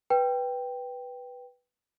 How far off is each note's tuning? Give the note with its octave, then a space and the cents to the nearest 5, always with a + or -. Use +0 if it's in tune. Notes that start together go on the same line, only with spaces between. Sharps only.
B4 -5 G5 +0